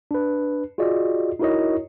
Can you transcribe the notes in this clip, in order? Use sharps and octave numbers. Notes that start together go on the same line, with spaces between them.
D4 B4
F4 F#4 G#4 D5 D#5
D#4 E4 F#4 A#4 C#5 D#5